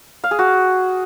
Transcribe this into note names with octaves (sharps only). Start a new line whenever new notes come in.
F5
G#4
F#4